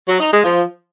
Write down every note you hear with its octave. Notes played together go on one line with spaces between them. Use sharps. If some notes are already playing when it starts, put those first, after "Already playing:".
F#3
D#4
G#3
F3